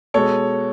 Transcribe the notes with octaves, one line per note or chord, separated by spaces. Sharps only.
B2 G#3 A4 C#5